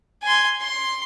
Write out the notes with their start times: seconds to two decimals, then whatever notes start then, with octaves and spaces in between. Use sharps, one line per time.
0.22 G#5 C6
0.60 C6